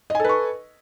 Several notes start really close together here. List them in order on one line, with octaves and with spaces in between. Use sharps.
D#5 G#5 A4 B4 C#6